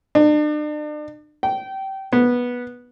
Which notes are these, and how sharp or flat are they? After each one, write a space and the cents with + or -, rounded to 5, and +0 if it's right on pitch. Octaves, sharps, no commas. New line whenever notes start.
D4 +40
G5 -25
B3 -15